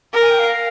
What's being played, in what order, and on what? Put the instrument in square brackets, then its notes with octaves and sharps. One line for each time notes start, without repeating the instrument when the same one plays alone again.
[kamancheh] A#4
[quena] G#5
G5
F5